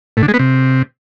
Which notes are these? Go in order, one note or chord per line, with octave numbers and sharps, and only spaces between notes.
A2
D3
G#3
B3
C3